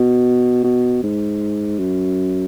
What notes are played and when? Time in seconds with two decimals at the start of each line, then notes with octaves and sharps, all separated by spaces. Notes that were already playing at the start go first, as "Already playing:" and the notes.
Already playing: B2
0.64 B2
1.03 G#2
1.78 F#2